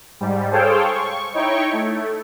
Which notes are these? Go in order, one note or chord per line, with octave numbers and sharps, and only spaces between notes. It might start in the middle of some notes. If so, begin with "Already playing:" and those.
G#2 G3
G#4 A4 C5 C#5 F5 G5
C#6
D#4 E4 C#5 G5 C#6
A3